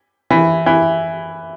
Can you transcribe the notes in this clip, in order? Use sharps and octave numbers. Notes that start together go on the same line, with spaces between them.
E3
E3